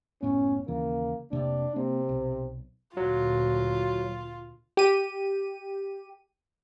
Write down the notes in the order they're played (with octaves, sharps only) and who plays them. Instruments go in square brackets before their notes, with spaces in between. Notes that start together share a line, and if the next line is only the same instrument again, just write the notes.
[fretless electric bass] F#1 A2 B3 [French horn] C#4
[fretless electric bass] D#2 C#3 E3 [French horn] A#3
[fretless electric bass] F1 C3 A#3 [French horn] D4
[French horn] C3 [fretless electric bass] A#3 C4
[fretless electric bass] B1
[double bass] D2 A#2 [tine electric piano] F#3 [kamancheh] F4
[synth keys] G4 D#7